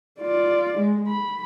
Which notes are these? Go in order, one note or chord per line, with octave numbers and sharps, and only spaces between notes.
F4 D5
G#3
B5